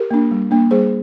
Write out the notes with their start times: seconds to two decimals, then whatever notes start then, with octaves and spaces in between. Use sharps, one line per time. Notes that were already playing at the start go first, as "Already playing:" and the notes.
Already playing: G4 A#4
0.11 A#3 D4
0.31 G3
0.51 A#3 D4
0.71 G3 G#4 C5